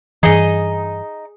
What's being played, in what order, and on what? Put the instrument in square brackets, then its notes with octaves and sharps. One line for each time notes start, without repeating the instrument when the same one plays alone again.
[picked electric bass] G2 E3 [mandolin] D#4 [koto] G#4 D#5